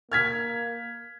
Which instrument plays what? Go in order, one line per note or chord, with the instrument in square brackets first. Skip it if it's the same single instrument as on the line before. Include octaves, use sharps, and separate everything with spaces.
[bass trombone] A#3 [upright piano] F6 G#6 B6